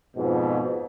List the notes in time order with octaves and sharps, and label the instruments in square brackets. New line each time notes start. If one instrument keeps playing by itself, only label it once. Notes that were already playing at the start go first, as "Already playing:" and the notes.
[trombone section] F2 G#2 B2